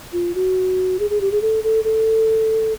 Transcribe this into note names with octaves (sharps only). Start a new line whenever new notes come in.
F4
F#4
G#4
G#4
G4
G#4
A4
A4
A4